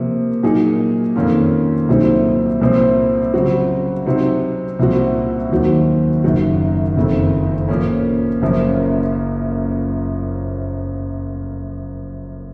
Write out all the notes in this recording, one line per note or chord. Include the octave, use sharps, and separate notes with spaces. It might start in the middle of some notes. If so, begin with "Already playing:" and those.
Already playing: C3 F3 A#3
A#2 F#3 A#3 D#4 G#4
F2 D#3 A#3 C#4 F4
C2 A#2 F#3 C4 D#4
C2 A#2 F3 C4
C#3 F#3 C4 F#4
C3 F#3 C4 D#4
C2 A#2 F3 C4 F#4
D#2 D#3 F#3 C4 F#4
F#1 F#2 D#3 F#3
F#1 F2 D#3
A#2 F3 A#3 C#4
F#1 F#2 F3 A#3 C#4